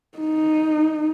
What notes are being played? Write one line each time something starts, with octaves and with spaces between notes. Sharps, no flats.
D#4